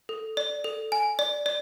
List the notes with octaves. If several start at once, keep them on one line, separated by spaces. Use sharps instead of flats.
A4
D5
A4
G#5
D5
D5